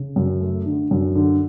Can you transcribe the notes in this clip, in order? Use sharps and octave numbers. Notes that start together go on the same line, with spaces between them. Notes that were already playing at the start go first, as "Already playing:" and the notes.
Already playing: C#3
F#2
A3
D3
F#2
D3